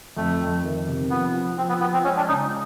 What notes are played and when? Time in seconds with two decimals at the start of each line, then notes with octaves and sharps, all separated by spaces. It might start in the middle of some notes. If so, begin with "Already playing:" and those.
0.17 F2 A3
0.41 F2
0.63 D#3
0.88 C3
1.10 F3 B3
1.34 F3
1.57 F3 C4
1.69 B3
1.81 F3 B3
1.93 C4
2.04 G#3 C#4
2.17 D4
2.28 C#3 D#4